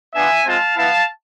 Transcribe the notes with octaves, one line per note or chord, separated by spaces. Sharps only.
B3 D4 F4 E5 G#5
G#3 C4 F4 F5 A5
B3 E4 F5 A5